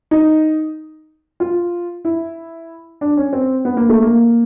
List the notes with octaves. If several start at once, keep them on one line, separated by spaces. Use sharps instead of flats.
D#4
F4
E4
D4
C#4
C4
B3
A#3
A3
A#3